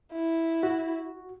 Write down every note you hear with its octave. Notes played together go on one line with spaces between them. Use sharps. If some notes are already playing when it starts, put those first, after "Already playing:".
E4
F#4